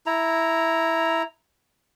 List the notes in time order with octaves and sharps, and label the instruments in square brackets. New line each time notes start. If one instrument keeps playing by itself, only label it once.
[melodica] E4 A#5